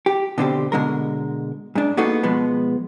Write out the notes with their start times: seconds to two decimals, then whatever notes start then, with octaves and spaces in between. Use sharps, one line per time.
0.06 G4
0.38 B2 D3 C4 G4
0.72 B2 D3 G#3 A#4
1.75 G#2 D4
1.97 A#3 B3 D#4 F#4 G#4 A4
2.23 B2 F3 G#3 B3